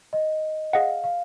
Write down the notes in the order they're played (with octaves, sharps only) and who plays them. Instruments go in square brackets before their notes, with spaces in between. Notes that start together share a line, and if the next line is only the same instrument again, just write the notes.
[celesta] D#5
[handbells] G#4 D#5 F#5 [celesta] F5
[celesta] F5